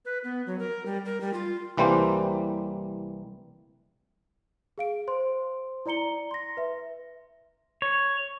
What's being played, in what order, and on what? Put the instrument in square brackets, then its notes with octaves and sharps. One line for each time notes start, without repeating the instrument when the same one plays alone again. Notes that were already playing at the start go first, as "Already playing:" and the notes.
[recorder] B4
B3
F#3
A#4
G3
A#4
G3
F4
[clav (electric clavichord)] C2 E3 G3 A#3 C5
[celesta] G#4 F5 D7
C5 C6
E4 D5 A#5 C#7 G7
C6 A#6
B4 E5
[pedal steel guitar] C#5